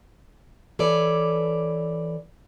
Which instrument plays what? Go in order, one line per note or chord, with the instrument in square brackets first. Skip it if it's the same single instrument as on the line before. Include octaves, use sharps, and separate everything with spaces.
[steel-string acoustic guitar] E3 A4 B4 C#5 D5